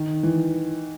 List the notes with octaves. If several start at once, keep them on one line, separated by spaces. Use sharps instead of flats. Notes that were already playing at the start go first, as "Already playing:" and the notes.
Already playing: D#3
E3